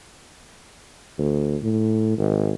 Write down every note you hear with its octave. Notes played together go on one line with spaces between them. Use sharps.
D2
A2
G#1